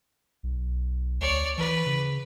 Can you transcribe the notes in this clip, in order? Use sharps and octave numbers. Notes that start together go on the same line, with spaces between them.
B1
D2 C#5 D5
E3 B4
C#3